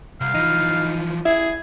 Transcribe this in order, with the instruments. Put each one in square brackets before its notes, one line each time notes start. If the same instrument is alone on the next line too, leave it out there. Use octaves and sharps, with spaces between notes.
[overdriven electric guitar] C2 [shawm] F5
[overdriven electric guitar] E3 F3 [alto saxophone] D#4
[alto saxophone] E4 [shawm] G#4